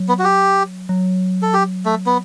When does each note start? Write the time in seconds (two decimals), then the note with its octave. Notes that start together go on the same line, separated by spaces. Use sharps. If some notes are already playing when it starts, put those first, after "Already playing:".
Already playing: F#3
0.09 B3
0.19 F#4
0.24 G4
0.89 F#3
1.42 A4
1.54 G4
1.85 A3
2.06 B3